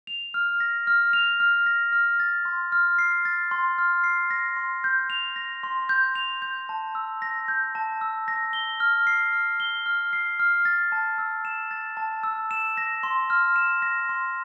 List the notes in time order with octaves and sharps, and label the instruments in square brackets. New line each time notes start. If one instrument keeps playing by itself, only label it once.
[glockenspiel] F7
F6
A#6
F6
F7
F6
A#6
F6
A6
C6
F6
C7
A6
C6
F6
C7
A#6
C6
G6
F7
A#6
C6
G6
F7
G6
A5
E6
A#6
G6
A5
E6
A#6
G7
F6
C7
F6
G7
F6
C7
F6
A6
A5
E6
E7
A6
A5
E6
E7
A#6
C6
F6
E7
A#6
C6